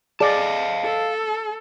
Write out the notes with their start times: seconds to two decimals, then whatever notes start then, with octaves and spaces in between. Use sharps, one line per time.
0.20 G#4 D5 D#5 F5 A5
0.84 A4